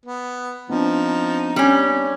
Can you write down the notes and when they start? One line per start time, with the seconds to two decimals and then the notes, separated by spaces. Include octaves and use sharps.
0.06 B3
0.70 F3 B3 C4 D4 D#4
1.56 G3 C#4